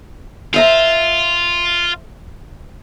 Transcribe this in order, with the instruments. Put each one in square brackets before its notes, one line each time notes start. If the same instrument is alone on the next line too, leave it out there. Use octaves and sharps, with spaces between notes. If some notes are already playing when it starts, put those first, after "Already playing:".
[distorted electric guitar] F4 [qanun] C5 E5 A#5